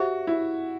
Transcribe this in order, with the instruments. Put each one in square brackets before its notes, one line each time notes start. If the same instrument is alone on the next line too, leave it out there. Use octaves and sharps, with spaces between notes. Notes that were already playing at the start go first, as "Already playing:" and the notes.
Already playing: [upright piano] F#4 [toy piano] G4 C5 E5
[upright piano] E4